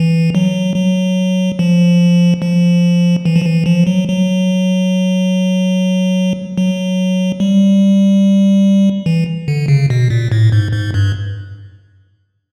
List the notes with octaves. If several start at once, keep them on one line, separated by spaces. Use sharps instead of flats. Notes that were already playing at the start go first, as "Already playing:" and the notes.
Already playing: E3
F#3
F#3
F3
F3
E3
F3
E3
F3
F#3
F#3
F#3
G3
E3
D3
C#3
B2
A#2
A2
G#2
G#2
G2